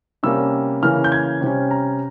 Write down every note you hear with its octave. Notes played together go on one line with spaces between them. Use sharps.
C3 G3 A#3 C#4 E6
C#3 E3 A#3 C#4 F6
G6
G#6
C3 G3 C#4
A#5